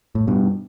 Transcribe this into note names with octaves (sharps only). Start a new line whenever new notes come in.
A2
G2 B2